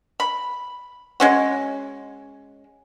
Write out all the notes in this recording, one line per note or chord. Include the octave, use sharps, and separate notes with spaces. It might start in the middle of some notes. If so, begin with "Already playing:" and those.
B5
G#3 C#4 F#4